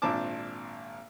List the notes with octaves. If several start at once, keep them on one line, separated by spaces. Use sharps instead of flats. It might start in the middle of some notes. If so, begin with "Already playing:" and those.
G#1 A#2 C4 D4 A5 D6